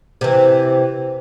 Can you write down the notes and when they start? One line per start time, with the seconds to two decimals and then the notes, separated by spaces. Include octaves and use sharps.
0.21 C3 E3